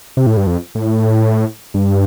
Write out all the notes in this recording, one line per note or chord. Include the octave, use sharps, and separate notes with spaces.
C3
A2
G2
F2
A2
G2